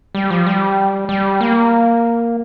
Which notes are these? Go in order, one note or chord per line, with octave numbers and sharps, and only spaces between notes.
G3
F3
G3
G3
A#3